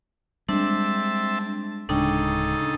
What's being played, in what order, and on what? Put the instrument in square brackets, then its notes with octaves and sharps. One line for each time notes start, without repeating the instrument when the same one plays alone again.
[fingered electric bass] G3 G#3 [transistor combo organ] C4 E5 A5 [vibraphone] D4
[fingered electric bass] D1 G#3 [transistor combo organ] C#3 D#4 A4 [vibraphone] D4 G5